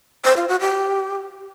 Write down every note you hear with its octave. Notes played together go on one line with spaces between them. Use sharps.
C5
F4
F#4
G4